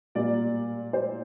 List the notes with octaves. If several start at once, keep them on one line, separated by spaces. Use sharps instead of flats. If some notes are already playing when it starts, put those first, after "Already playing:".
A#2 G3 A#3 D5
C5